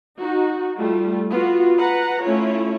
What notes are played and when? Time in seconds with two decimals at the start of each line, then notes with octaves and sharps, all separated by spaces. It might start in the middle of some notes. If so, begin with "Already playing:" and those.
0.20 D#4 F#4
0.78 G3 A3 F4
1.31 B3 F4 F#4
1.79 B4 F#5 A#5
2.24 A3 C#4 E4 F4 C#5